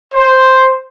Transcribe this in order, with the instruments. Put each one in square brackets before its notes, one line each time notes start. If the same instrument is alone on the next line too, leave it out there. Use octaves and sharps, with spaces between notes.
[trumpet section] C5